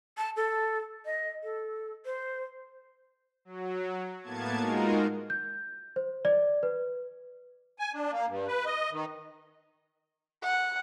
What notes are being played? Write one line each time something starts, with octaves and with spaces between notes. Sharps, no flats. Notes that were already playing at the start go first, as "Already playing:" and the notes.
A5
A4
D#5
A4
C5
F#3
A2 A#3 B3 A5 G#6
G#3 D#4 F4 F#4 A#4
G6
C5
D5
B4
G#5
D4
A#3
G2
B4
D#5
D#3
F#5